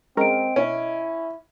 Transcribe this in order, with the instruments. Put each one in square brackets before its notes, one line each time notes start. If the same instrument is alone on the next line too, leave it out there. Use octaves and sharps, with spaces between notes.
[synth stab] G#3 C#4 A#4 [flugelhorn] C4 [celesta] D#5 D7
[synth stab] B2 [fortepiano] C#4 [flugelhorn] E4